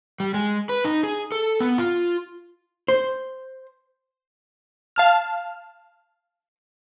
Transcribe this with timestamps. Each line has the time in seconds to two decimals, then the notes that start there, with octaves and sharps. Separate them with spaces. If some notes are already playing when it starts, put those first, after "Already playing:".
0.20 G3
0.34 G#3
0.69 B4
0.84 D#4
1.03 G#4
1.32 A4
1.60 B3
1.78 F4
2.88 C5
4.96 F5 A5 F6